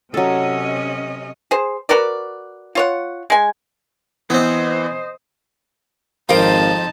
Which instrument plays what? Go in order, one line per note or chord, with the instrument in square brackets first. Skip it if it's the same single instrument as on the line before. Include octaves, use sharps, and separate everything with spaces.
[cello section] C3 C#4 D#5 [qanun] F#3 A4
[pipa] G#4 C5
F#4 A#4 B4 D5
F4 C#5 F#5
G#3 G#5
[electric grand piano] E3 D#6 [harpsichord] B3 C4 [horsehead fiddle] C5 D#5
[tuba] G#1 [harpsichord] F2 F3 [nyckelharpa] D#4 A5 [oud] A#4 F5